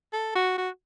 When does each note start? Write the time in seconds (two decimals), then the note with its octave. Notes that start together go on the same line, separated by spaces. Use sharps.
0.13 A4
0.35 F#4
0.58 F#4